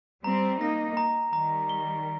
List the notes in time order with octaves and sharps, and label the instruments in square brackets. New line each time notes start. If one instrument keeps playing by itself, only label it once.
[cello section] G3 C4 [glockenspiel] A#5
[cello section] A#3 D#4 [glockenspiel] A#6
[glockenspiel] A#5
[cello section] D#3 G3 [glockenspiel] A#5
[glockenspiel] G7